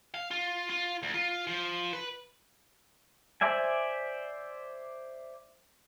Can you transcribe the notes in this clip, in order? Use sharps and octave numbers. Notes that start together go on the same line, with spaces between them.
F5
F4
F4
D2
F4
F3
B4
C5 D5 E5 G#5